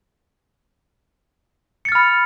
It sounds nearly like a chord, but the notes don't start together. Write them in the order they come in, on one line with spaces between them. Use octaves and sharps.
C#7 A6 F6 B5